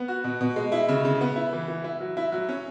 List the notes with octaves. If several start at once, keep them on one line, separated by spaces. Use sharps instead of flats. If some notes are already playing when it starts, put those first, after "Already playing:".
Already playing: B3
F#4
B2
B2
G#3
E4
C#3
C#3
B3
E4
E3
E3
E4
F#3
E4
F#3
C#4